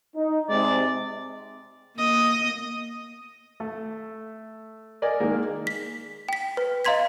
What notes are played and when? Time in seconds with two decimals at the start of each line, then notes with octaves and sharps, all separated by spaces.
0.15 D#4
0.49 C3 G#3 D5
1.96 A#3 D#5
3.60 A3
5.02 A#4 D5 D#5 G#5
5.20 D#3 G#3 A#3
5.67 B6
6.29 G5 B6
6.57 B4
6.85 D#5 F5 A#5 C6 G#6 B6